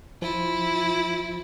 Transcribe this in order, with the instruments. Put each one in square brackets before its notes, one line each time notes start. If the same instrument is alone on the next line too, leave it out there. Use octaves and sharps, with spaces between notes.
[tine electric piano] F3 [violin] E4 [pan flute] F4